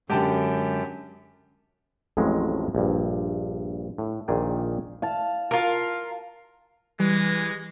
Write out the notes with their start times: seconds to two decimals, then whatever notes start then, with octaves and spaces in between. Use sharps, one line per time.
0.10 F#2 D3 G#3 G4 G5 A5
2.17 A1 F2 A2 F3 F#3 G#3
2.75 A#1 G2
3.98 A2
4.28 A#1 A#2 D#3 G#4 D5 G5
5.02 F5 A5
5.51 F4 A#4
7.00 E3 G3 G#3